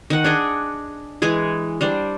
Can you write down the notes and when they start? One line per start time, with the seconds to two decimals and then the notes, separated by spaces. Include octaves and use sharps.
0.10 D#3 F#5
0.24 D4 G#4 D#5
1.22 E3 G#3 G#4
1.81 G3 D4 C5